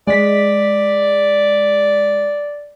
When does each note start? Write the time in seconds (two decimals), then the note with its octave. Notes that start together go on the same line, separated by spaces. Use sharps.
0.07 G#3 D5 B6